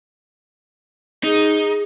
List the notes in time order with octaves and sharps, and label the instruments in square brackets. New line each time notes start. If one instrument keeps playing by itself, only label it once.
[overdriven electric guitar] D#4 [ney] G#4